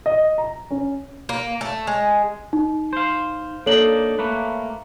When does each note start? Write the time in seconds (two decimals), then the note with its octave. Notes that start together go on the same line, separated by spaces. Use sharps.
0.06 D#5
0.38 A#5
0.71 C#4
1.29 A#3
1.61 A3
1.87 G#3
2.53 D#4
2.93 C5 F5
3.66 A#3 D4 D#4 A4 C#5 F#7
4.19 A3 A#3 B4